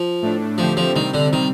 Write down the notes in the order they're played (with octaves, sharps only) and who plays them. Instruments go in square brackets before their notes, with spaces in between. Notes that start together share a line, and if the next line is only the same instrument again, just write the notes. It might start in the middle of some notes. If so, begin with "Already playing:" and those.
Already playing: [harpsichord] F3
[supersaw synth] A2 A3 D4
[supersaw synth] D3 A3 C4 G4 C5 [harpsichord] F3
[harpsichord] F3
[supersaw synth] C3 G3 C4 [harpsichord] D#3
[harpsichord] D3
D#3